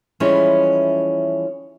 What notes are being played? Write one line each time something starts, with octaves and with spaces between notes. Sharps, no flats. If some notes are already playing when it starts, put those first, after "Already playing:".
E3 F3 G3 G#3 C#4 E4